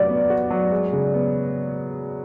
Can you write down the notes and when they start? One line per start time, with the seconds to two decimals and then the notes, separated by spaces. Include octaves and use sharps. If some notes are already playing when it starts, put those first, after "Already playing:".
Already playing: F#3 F#4 D5
0.09 B3
0.30 F#4
0.50 F#3
0.71 G#3
0.93 C#3
1.14 B3